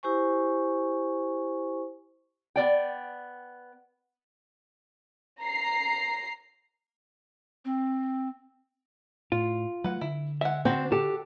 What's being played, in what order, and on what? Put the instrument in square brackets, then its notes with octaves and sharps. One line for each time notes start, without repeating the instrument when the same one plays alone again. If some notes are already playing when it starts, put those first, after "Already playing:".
[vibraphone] E4 G4 C5 G#5 C#6
[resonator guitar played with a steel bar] B3 D5 G5
[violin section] A#5 C7
[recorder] C4
[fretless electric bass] A2 [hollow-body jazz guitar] F4
[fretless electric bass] F#3 A3 [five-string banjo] B4 F#5
[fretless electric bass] D3 [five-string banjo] E4
[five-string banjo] G#3 F#5 [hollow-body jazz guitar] E5
[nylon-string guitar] C4 [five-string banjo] D4 F#4 B4
[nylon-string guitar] G4 [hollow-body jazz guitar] A4